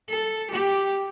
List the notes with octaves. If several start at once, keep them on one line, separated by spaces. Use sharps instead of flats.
A4
G4